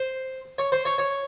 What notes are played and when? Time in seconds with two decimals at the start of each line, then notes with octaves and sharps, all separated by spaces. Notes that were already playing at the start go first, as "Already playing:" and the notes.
Already playing: C5
0.58 C#5
0.72 C5
0.85 C#5
0.98 C#5